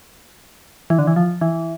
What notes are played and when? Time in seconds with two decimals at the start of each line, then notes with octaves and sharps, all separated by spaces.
0.90 E3
0.99 D3
1.07 E3
1.16 F3
1.41 E3